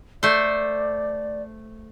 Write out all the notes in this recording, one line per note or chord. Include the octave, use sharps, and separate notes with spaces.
A3 C5 D5